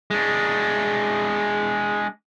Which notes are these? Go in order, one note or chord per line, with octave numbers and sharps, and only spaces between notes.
G#3 D4